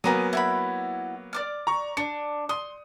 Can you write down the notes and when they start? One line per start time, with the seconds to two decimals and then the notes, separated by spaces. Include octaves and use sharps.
0.04 F#3 A#3 B3 G#5 A#5 D#6
0.33 E4 F#4 B5
1.33 D5 D6 F6
1.67 A#5 C#6
1.97 D4 C#7
2.49 C6 D#6